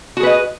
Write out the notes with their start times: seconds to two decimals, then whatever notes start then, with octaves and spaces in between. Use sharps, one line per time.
0.17 F#4
0.20 G#4
0.23 B4
0.27 D#5